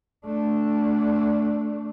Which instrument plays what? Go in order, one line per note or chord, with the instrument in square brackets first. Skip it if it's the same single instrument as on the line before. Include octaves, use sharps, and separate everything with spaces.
[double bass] A3 D4